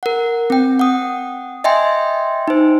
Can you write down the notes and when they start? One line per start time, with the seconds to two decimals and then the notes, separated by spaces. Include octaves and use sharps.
0.03 A#4 F#5
0.50 C4 G5
0.79 F#5 D#6
1.64 D#5 E5 G5 G#5 C6
2.48 D#4 C5